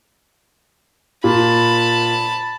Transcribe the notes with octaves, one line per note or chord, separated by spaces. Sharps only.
A#2 A5 B5